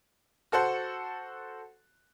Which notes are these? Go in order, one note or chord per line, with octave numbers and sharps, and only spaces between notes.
F#4 A4 C5 F#5